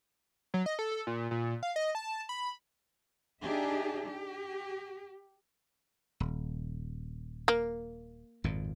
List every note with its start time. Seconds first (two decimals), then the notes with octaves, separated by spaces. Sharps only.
0.54 F#3
0.66 D#5
0.79 A4
0.91 A4
1.07 A#2
1.31 A#2
1.63 F5
1.76 D#5
1.95 A5
2.29 B5
3.42 D4 D#4 G4 G#4 E5
4.06 G4
6.20 D#1
7.48 A#3
8.44 G#1 F2 A#2